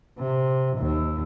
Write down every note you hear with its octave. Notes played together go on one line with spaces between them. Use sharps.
C3
D#2